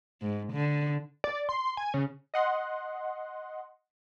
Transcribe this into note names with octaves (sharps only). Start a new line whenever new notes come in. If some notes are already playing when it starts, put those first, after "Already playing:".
G#2
D3
D5
C6
G#5
C#3
D#5 F#5 C6